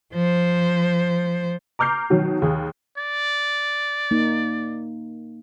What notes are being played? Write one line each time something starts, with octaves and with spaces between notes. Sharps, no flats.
F3 C5
A#5 D6 F6 G6 C7
B2 D#3 F#3
D#2 G#4
D5
A#3 D#4